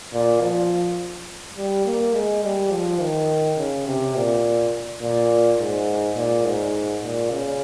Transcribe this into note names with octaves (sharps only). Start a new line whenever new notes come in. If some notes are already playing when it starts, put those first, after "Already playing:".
A#2
F3
G3
A#3
G#3
G3
F3
D#3
C#3
C3
A#2
A#2
G#2
A#2
G#2
A#2
C#3